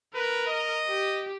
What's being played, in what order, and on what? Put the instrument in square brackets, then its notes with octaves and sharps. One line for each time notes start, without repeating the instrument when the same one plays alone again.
[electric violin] A#4 [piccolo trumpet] B4
[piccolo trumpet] D#5
[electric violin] G4